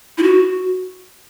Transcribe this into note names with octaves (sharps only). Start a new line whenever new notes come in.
E4
F#4